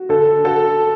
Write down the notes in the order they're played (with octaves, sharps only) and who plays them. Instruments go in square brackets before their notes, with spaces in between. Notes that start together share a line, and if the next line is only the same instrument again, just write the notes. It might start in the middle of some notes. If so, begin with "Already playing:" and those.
Already playing: [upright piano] F#4
[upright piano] D3 [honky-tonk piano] A4
[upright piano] F#4 [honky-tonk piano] A4